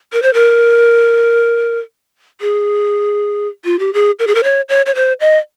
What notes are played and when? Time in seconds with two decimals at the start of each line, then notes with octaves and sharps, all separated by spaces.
0.13 A#4
0.22 C5
0.34 A#4
2.41 G#4
3.65 F4
3.79 G4
3.93 G#4
4.19 A#4
4.27 G#4
4.35 A#4
4.44 C#5
4.69 C#5
4.86 C#5
4.95 C5
5.20 D#5